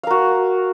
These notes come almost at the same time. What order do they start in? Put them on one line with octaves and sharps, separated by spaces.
F5 A#4 F#4